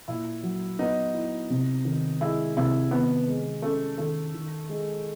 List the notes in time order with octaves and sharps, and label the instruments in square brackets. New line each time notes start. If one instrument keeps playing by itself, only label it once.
[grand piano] A#2 [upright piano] E4
[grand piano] F#3
[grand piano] B3 [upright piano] D#4
[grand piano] E4
C3
D#3
[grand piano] G#3 [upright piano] E4
[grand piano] C3 [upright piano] E4
[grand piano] D#3 [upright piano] B3
[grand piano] G#3
[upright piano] A3 [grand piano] C#4
[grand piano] D#3 [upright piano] A3
[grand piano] D#3
G#3